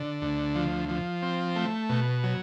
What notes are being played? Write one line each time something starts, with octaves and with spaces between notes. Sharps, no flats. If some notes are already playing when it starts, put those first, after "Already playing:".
Already playing: D3
D2
F3
F3
C4
A3
B2
F#3